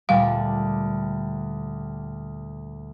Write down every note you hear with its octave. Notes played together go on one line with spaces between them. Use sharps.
D2 A#2 G3 F5